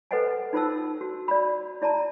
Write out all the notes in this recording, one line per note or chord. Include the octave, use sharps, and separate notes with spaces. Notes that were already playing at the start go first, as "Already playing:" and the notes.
A4 B4 C5 D#5 F#5 G#5
D#4 F4 C5 A5 E6
F#4
D5 B5
E4 D5 A5 A#5